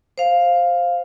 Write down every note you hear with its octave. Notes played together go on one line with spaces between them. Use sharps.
C5 F5